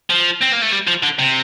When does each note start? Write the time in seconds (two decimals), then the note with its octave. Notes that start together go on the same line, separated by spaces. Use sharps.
0.10 F3
0.41 C4
0.52 A#3
0.62 A3
0.72 G3
0.88 F3
1.03 D3
1.19 C3